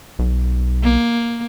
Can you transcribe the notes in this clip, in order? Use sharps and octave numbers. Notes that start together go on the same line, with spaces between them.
B1
A#3